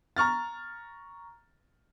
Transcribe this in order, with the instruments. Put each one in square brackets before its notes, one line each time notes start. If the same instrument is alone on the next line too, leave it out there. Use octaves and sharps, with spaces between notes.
[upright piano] A#5 C#6 F6 A6